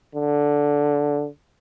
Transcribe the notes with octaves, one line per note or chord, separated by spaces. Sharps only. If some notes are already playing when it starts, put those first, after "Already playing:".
D3